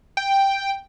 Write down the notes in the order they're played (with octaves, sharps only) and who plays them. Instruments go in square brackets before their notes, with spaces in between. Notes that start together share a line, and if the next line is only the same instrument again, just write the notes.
[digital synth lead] G5